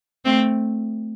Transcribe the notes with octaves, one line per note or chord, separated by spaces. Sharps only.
A3 C4